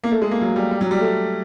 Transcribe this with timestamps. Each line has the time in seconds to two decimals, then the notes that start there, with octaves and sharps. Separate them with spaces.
0.04 A#3
0.12 A3
0.22 G#3
0.31 A#3
0.41 F#3
0.56 G3
0.71 G3
0.81 F#3
0.91 G3
1.00 A3